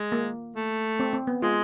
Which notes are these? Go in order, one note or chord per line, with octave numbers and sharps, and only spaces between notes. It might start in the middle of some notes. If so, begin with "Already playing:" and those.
Already playing: G#3
A#3
A3
C4
C4
B3
G#3 F4